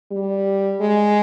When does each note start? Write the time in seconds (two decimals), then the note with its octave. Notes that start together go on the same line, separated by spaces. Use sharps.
0.11 G3
0.80 G#3